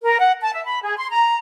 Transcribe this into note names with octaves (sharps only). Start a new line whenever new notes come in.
A#4
F#5
A5
E5
B5
G#4
C6
A#5